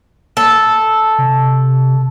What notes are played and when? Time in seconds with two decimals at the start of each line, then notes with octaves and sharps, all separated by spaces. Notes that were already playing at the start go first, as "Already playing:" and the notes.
0.37 A4
1.18 C3